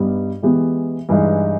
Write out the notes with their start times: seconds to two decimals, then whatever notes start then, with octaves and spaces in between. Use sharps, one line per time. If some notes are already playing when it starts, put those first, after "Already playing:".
Already playing: G2 G3 B3 D#4
0.43 E3 G#3 B3 G4
1.09 G2 E3 G#3 D#4